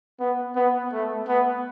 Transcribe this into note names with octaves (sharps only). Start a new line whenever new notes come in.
B3
B3
A3
B3